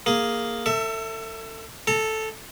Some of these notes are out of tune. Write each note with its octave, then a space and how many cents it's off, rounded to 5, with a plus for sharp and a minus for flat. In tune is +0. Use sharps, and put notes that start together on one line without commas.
A#3 +0 G#4 +0
A4 +30 E5 +0
A4 -5 A#5 -40